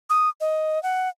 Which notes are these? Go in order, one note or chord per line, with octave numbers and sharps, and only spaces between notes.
D#6
D#5
F#5